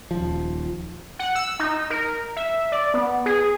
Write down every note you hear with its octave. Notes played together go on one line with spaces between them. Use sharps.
D#1 F3
F#5
E6
D#4
A#4
E5
D5
B3
G#4